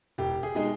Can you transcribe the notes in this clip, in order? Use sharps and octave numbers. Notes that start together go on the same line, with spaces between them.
E1 G4
G#4
B2 G#3 D#4